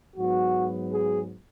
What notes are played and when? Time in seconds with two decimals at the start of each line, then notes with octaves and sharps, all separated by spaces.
0.16 G#2 F#3 B3 F#4
0.91 G#4